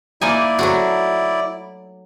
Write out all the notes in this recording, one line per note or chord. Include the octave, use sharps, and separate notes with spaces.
A#3 D#4 E4 D5 G#5
F#3 A3 F#4